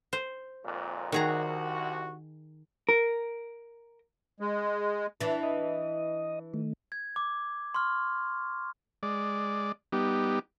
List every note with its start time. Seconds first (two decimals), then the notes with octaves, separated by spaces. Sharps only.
0.13 C5
0.65 G#1 F2 A#2
1.12 C2 D#3 F#4 G#4 A#5
2.89 A#4
4.40 G#3
5.20 E3 D4
5.43 D#5
6.54 D#3 A3
6.92 G#6
7.16 D6
7.74 C6 C#6 F6
9.03 G#3 D5
9.92 G3 B3 D#4 G4